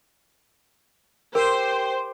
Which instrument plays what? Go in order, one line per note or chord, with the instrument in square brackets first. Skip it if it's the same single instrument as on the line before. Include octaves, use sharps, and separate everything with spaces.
[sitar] G4 [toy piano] A#4 [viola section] C5